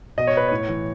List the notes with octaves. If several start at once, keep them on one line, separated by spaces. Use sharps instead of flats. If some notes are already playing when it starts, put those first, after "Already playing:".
B2 D#5
C#5
B4
A2 C#5
E3